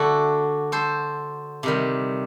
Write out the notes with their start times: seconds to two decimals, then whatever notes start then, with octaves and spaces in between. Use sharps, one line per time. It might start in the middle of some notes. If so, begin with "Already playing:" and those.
Already playing: D3 A3 F#4 A4
0.72 A4 C5
1.63 C3 D#3 G3